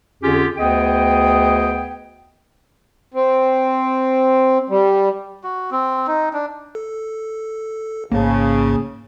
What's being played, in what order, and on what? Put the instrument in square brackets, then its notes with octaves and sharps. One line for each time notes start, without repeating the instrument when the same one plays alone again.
[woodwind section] F2 D3 C#4 F4 G4 G#4
D2 B3 G#4 D#5 G5
[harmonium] C4
G3
[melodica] F#4
C4
D#4
D4
[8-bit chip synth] A4
[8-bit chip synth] A1 G#2 [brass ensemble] C#3 [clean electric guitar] A#3 C5 A5